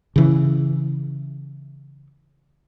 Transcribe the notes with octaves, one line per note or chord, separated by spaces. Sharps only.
C#3 E3